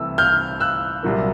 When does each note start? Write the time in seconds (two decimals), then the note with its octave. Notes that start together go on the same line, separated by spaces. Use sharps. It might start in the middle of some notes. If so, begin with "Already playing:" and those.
Already playing: C2 C3 E3 A3 E6
0.18 F6 G6
0.60 E6 F#6
1.03 C2 A#2 F#3 A#3